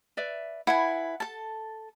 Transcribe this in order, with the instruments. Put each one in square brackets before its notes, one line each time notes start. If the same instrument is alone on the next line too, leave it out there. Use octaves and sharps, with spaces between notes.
[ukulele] B4 D5 E5
[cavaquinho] E4 B4 G#5 [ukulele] F#5
[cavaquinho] A4 A5